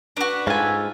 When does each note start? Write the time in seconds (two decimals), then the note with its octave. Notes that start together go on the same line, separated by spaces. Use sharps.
0.17 D4 F#4 B4
0.47 G#2 F4 A4 G#5